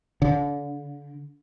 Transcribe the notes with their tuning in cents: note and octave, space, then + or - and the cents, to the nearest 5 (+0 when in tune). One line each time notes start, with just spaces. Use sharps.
D3 -35